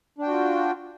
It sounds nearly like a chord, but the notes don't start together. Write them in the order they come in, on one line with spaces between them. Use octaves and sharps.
D4 G5 F#4 F4